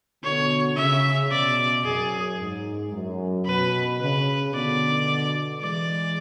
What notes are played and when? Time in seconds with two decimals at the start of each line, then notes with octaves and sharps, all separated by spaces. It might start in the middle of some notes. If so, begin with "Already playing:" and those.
0.23 B2 D3 C#5
0.77 C#3 E5
1.31 B2 D5
1.84 F#2 G#4
2.39 G#2
2.93 F#2
3.46 B2 B4
4.00 C#3 B4
4.54 B2 D3 D5
5.61 E3 G#3 D5